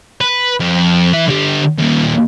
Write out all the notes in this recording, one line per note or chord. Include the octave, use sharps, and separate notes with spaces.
B4
F2
E3 E5
D3 G4
D#2 A#2